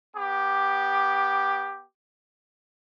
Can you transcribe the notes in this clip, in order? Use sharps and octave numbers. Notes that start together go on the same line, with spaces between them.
B3 G4 D6